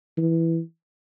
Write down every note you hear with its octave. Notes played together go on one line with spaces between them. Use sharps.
E3